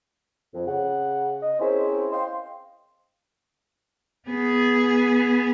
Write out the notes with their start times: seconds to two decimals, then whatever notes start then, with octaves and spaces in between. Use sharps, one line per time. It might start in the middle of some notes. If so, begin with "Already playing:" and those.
0.54 F2
0.66 C#3 F#5
1.42 D#5
1.60 C4 C#4 E4 G#4 A#4 C5
2.12 C5 D#5 F5 G5 C6
4.28 B3 G#4